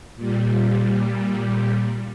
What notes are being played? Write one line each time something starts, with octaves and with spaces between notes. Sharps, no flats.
A#2 G3